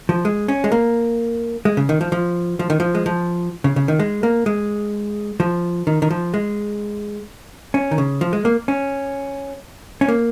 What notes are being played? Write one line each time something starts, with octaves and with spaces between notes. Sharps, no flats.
F3
G#3
C#4
G#3
A#3
G#3
C#3
D#3
F3
F3
F3
D#3
F3
G#3
F3
C#3
C#3
D#3
G#3
A#3
G#3
F3
D#3
D#3
F3
G#3
C#4
D#3
C#3
F3
G#3
A#3
C#4
C#4
A#3